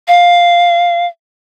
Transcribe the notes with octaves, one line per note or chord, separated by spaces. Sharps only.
F5